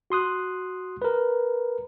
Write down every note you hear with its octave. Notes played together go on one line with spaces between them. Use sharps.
F#4 C6 D#6 F#6
A#4 B4